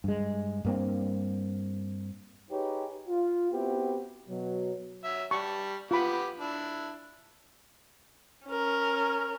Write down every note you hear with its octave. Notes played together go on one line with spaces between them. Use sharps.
G2 G#3
G2 A#3 C4
D#4 G4 G#4 B4 C#5
F4
B3 C4 E4 F#4 G4
B2 F#3
F#3 E5
G3 A5 C#6
B3 F4 G4 B5 D6
D4 E4
C#4 A#4